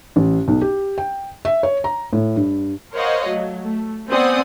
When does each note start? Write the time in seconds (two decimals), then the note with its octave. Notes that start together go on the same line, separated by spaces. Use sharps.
0.16 A1
0.48 B1
0.61 G4
0.98 G5
1.45 E5
1.63 C#5
1.84 A#5
2.13 A2
2.36 G2
2.94 A#4 C5 C#5 D#5 F5 F#5
3.26 F#3 A3
3.62 A3
4.10 B3 C4 D5 F#5 G#5 D#6